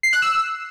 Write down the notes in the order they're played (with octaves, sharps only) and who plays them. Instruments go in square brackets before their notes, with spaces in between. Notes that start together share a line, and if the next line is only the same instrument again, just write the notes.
[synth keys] C7
F#6
E6